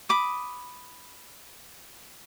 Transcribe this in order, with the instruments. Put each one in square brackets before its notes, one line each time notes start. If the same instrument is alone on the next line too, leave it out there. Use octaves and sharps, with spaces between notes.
[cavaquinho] B5 D6 D#6